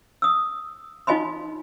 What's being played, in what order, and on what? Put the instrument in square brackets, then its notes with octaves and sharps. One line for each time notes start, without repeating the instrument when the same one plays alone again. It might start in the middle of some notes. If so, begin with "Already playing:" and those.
[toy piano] D#6 E6
D#4 F4 D#5 G#5 B5 C6